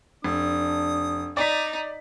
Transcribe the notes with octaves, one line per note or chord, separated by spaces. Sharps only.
F1 D4 D#6
D#4 D5 B6